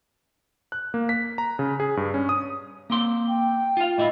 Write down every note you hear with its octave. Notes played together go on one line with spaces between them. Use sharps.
F#6
A#3
B6
A#5
C#3
G#4
G2
C#4
D#6
A#3 C4 C6
G5
F4 F5
A2 E4 F4 D#5